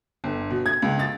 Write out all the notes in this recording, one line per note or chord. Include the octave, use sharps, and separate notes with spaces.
G1
B2
G#6
C#2
A6